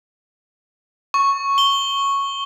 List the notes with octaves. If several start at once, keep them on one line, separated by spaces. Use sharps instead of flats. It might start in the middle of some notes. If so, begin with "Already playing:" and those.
C#6
G7